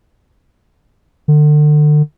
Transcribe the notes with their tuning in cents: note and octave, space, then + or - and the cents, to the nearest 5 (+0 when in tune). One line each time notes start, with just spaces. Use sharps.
D3 +35